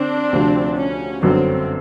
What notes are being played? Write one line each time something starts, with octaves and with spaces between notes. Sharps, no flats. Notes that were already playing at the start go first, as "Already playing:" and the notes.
Already playing: D3 C4 D4
D2 C3 F3
C#4
G1 F#2 D3 F#3 C4